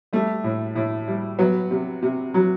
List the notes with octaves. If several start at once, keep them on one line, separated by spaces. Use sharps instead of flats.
G3 A3
A2
A2
G3
F#3 B3
C3
C3
F#3